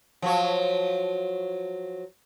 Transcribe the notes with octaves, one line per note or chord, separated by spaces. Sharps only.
F3 F#3 C#5